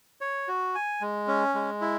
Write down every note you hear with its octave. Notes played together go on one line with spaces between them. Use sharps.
C#5
F#4
G#5
G#3
C#4
G#3
E4